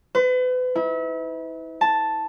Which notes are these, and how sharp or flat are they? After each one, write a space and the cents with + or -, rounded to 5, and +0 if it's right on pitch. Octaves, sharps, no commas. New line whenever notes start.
B4 +35
E4 -35
A5 +0